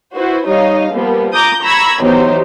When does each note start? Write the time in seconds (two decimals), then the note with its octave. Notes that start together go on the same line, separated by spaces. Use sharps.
0.14 E4 F#4 B4 C5
0.46 G3 D#4 C#5 D#5 F5
0.92 F3 G3 A#3 B3
1.33 A#5 D6 D#6 G6
1.62 A#5 B5 C#6 E6 G#6
2.01 E3 F#3 B3 D#4 G4 C5